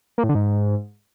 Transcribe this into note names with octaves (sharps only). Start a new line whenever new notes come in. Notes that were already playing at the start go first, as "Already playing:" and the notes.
A#3
A2
D3
G#2